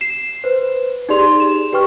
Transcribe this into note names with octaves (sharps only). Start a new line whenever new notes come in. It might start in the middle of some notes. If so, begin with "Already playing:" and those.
C7 E7
B4 C5
D#4 G4 G#4 D5 C6 F7
E7
G4 B4 G5 C#6 F6